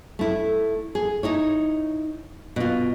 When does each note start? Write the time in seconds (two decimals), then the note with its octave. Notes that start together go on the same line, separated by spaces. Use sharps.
0.19 A3 E4
0.95 G#4
1.23 D#4 E4 C#5
2.56 B2 F4